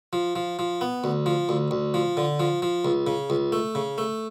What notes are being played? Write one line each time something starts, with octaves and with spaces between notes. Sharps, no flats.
F3
F3
F3
B3
D2
F3
D2
D2
F3
D3
F3
F3
C#2
C#3
C#2
A3
C#3
A3